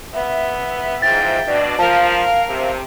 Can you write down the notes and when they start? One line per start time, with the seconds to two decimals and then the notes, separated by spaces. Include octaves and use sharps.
0.14 B3 E5
1.02 G#2 E3 F3 G5 A6
1.48 B2 D4 D5
1.79 F3 A#4 F5 A5
2.48 C3